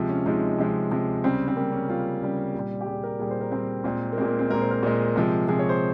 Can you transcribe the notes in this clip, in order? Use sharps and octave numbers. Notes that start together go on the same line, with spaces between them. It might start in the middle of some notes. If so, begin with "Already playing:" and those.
Already playing: C3 F3 G#3
C#4
C3 F3 G#3 D#4
C3 F3 G#3
C3 F3 G#3
C#3 G3 C4
C4
C#3 G3 A#3
C#4
C#3 G3 F4
C#3 G3
A#2 G3
G4
A#2 G3 G#4
A#4
A#2 G3 G#4
C5
A#4
A#2 G3 C4
A#2 G#3 C4
A#3
A#2 G#3 C4
A#3
C4
A#2 G#3 A#4
C5
A#4
A#2 G#3
C3 F3 G#3
C3 F3 G#3 G#4
C#5
C5